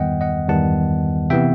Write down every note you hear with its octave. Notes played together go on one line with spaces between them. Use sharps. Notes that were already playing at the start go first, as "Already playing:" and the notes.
Already playing: E2 D#3 G3 B3 D#5 F#5 G5
D#5 F#5
E2 D#3 G3 B3 F#5 A5
C3 E3 B3 E5 G5